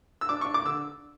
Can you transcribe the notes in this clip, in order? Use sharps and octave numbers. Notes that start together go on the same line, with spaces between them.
E6
D4 D6
C#6
D4
D6
D3 E6